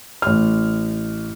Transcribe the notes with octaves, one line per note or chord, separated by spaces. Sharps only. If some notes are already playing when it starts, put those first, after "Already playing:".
A1 F6